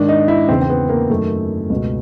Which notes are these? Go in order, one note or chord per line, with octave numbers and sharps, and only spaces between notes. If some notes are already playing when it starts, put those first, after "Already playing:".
Already playing: G#2 D#3 D4
D#4
E4
E2 C#3 E3 C4
C4
B3
A#3
F#2 D#3 A3
C#2 B2